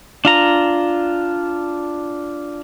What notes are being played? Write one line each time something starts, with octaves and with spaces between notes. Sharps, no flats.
D4 F4 A#5